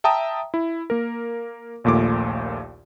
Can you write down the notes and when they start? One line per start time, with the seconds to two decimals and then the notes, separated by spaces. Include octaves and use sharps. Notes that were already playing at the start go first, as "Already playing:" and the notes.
0.04 E5 G5 A5 A#5 D#6
0.54 E4
0.90 A#3 A#4
1.84 A#1 D#2 A#2 A3 D6